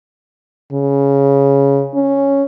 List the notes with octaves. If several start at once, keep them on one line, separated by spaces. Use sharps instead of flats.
C#3
C#4